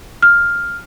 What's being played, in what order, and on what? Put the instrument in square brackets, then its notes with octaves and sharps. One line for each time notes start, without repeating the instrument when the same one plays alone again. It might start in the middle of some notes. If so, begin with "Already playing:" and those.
[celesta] F6